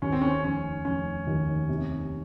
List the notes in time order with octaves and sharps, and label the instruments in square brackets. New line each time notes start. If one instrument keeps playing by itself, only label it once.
[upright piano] D#2 [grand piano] C#4
[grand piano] C4
C#4
[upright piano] F1 [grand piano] C#4
[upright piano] F1 [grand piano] C#4
[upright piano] D#2
C3